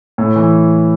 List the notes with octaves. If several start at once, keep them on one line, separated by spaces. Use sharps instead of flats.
A2
E3